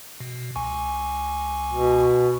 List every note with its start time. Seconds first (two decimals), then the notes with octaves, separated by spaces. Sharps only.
0.20 B2
0.56 C#2 G#5 C#6
1.72 B2